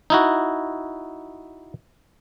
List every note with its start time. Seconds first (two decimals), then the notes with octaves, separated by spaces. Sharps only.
0.10 D#4 E4 F#4